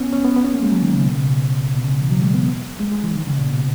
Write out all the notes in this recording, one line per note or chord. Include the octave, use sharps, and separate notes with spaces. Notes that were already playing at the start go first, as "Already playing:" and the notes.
Already playing: B3 C#4
C#4
B3
B3
C#4
A#3
G#3
F#3
D#3
C#3
B2
C#3
B2
B2
C#3
B2
E3
F#3
G#3
B3
G#3
G#3
E3
D#3
C#3
A#2
B2